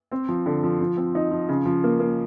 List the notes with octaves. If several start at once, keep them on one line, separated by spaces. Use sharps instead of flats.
C4
F3
D3
F3
F3
C4
D#4
F3
C#3
F3
A#3
A#3